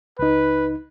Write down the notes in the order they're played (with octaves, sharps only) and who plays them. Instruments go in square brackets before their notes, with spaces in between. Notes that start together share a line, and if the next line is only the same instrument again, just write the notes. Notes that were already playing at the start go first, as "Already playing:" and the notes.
[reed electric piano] C#2 D#4 [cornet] B4